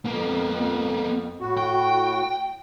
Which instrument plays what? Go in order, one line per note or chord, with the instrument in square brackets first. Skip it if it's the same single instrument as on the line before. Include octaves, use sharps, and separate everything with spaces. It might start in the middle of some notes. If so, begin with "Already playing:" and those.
[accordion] F2 [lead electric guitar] A#3 B3
[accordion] A2 F#4
[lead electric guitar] G5